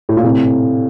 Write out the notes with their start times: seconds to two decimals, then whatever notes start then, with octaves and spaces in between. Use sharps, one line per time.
0.09 A2
0.17 A#2
0.23 A2 C3